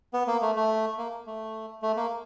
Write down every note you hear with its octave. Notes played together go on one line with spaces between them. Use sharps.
B3
A#3
A3
A3
A#3
A3
A3
A#3